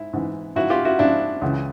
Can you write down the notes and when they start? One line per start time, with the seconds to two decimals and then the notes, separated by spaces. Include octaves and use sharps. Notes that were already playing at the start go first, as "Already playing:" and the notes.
Already playing: G#2 E4
0.13 G#2 E3
0.56 G#2 F3 E4 F#4
0.70 F4 G4
0.85 E4 F#4
0.99 G#2 F3 D4 E4
1.41 C#2 C#3 E3